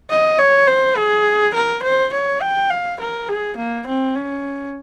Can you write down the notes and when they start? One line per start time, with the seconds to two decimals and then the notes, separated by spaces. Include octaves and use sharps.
0.10 D#5
0.39 C#5
0.67 C5
0.97 G#4
1.54 A#4
1.83 C5
2.13 C#5
2.41 G5
2.70 F5
3.00 A#4
3.29 G#4
3.57 A#3
3.87 C4
4.15 C#4